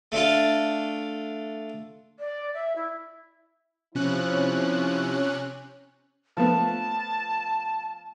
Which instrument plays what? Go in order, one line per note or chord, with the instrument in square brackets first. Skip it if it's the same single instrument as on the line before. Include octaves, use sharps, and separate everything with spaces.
[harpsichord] A3 D4 F4
[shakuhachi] D5
E5
E4
[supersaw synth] C3 C#4 F#6 [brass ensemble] F3 E4
[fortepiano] F3 A3 B3 [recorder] A5